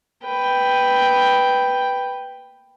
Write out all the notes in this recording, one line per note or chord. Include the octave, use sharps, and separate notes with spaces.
B4 G5